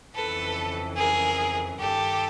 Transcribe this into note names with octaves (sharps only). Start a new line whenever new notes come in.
F2 C#3 E3 A4 B4
G#4 A#4
G2 D#3 G4 A4